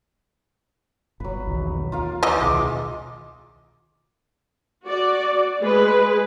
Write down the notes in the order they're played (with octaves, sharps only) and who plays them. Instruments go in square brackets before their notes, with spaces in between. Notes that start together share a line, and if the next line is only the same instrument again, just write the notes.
[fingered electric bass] G1 [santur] F#3 B4
[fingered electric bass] B1 E2 D#3
[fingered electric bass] D#2 [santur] F4 A#4 F5
[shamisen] E3 D#5 [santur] F4 A#4 E5
[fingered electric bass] C2 B2 D#3 [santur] G#3 D6
[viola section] F#4 D5
G#3 G#4 B4